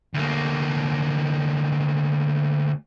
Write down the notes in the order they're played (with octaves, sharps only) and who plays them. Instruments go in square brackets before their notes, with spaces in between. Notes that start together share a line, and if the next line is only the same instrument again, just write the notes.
[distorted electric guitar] D2 A#3